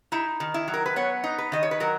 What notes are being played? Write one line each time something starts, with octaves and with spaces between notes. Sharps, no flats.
D#4 E4
D#3
E4
F#3
A#4
B4
B3 C#5
D#4
B4
D#3 D#5
C#5
B4
F#3 A#4